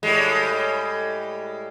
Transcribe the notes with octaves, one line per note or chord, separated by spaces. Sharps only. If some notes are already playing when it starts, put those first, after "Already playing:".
A2 G3 G#3